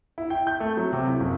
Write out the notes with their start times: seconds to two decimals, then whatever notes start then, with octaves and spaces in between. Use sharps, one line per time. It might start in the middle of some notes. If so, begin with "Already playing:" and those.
0.18 E4
0.30 G5
0.47 G6
0.60 A3
0.77 F#3
0.93 C3
1.08 E4
1.20 F#1